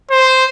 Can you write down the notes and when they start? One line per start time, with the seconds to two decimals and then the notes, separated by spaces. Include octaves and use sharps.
0.11 C5